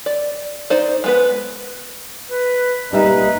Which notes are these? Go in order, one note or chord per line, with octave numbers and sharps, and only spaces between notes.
D5
D#4 C5 D5
G#3 B3 B4
B4
G3 A#3 D#4 B4 E5